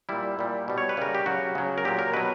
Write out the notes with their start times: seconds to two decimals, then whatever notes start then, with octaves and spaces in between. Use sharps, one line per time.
0.09 A#2 G3 E4
0.39 A#2 G3
0.68 B2 G3
0.78 C#5
0.89 B4
0.97 C#3 G3 A#4
1.15 G4
1.26 C#3 F#3 F#4
1.55 C#3 F#3
1.78 A#4
1.85 A#2 F#3 G4
1.99 A#4
2.14 B2 F#3 B4